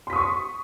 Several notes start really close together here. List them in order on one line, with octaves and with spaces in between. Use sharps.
C6 B6 D#6 C#6